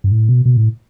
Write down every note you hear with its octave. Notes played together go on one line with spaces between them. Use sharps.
G2
A2
B2
B2
A2